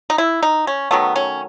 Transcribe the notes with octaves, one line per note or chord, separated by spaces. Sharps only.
D#4
E4
D#4
C#4
D#3 F#3 A3 B3
C#4